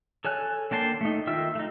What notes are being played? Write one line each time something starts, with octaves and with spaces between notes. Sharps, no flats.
A4 C#5 G#5 F#6
D3 A#3 G5 A5 C6
A3 D#4
D#3 F4 E5 G5 E6
A3 D#4